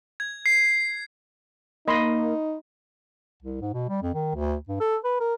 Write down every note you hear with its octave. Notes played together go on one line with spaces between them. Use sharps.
G#6
C7
A#3 D#4 D#5 B5 C6
C2
G#2
B2
G3
F2
D#3
D2
G2
A4
B4
A#4